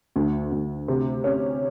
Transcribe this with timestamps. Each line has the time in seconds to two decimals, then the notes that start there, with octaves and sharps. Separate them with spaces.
0.16 D2
0.52 D2
0.88 C3
1.24 C#4